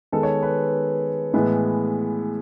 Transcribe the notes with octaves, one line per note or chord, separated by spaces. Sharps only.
D#3 G#3 B3 A4
C#5
B4
A2 E3 G#3 B3